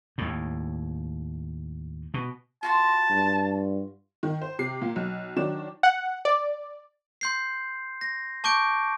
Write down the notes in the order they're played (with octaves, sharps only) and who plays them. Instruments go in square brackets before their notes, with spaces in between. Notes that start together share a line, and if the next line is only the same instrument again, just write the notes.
[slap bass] D#2 A2
B2
[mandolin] F4 F#4 C6 [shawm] A5
[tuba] G2
[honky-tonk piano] D#3
C5
C3 C7
A#2
B1
D#3 F#3 D4 E7
[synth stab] F#5
D5
[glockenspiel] C6 G6 C7
A#6
A5 C#6 D6 G6 D7